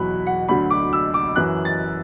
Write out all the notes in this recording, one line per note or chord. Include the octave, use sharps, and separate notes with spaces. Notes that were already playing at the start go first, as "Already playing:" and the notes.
Already playing: E2 B2 F#3 B5 F#6
F#5
D2 D3 F#3 B5
D6
E6
D6
F#2 E3 F#6
A6